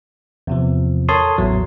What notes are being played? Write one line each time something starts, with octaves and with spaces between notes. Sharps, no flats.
E2 C3 F3
A4 A#4 C#5 A5 C6 D#6
A1 E2 F#3